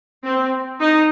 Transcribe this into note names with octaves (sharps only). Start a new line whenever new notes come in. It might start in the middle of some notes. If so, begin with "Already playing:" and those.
C4
D#4